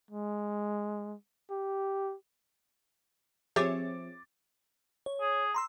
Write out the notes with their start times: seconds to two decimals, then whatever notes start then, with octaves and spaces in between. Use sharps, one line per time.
0.11 G#3
1.51 G4
3.56 F3 C4 G4 G#4 C#5 E5 D6 A6
5.06 C#5
5.21 G#4
5.54 A#5 C6 E6